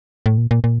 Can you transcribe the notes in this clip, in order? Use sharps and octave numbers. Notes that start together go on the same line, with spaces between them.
A2
A#2
A#2
A#2